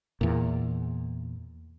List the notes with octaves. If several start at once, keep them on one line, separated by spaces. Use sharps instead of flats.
E2 A#2